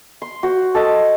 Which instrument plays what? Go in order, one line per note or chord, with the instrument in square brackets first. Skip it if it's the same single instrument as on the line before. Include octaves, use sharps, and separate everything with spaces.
[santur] C6
F#4 C5
A4 D#5 A5